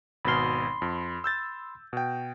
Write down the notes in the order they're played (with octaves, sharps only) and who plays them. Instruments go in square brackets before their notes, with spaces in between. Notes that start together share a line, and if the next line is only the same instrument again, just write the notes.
[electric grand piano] G#1 B2 F6 [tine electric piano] B5 C6
[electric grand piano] F2
E6 G6 A6
B2 G5